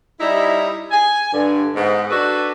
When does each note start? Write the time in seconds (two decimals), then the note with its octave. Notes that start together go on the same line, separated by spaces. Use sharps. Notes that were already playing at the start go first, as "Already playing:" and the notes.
0.20 G3 D#4 E4
0.91 G#5
1.33 G2 D3
1.76 G#2 B3
2.10 D4 F#4 A4 B4